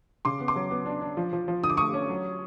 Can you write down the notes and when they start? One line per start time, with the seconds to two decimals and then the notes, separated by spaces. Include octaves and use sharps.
0.25 C#3 C6 D6
0.40 B3
0.48 C6 D6
0.56 F#3
0.71 B3
0.86 D4
1.01 D4
1.17 F3
1.33 F3
1.48 F3
1.63 D3 D#6
1.70 D6
1.77 A3 C#6 D#6
1.93 C#4
2.09 F#3